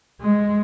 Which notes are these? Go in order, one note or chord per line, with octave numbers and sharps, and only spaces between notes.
G#3